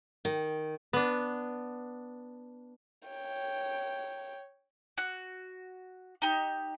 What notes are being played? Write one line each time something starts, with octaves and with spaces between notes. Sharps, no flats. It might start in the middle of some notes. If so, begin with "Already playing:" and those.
D#3
B3 D4
C#5 G5
F#4
D#4 G4